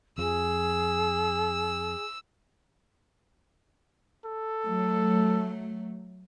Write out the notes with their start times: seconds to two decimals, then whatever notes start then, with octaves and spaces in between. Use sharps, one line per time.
0.18 F2 F3 G#4 E6
4.25 A4
4.64 F#3 A3